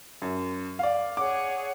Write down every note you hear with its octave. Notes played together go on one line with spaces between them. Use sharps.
F#2
D5 F5
G#4 C#5 F#5 D6